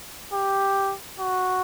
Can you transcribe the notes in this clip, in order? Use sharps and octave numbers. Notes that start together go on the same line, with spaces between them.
G4
F#4